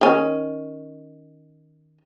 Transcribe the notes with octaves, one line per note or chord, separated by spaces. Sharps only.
D#3 C#4